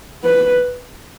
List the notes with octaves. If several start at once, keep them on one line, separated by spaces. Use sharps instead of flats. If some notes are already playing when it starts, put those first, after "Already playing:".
B4